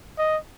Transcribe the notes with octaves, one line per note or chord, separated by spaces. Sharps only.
D#5